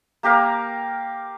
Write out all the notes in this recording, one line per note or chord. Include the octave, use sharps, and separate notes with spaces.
A#3 G4 A#4 F5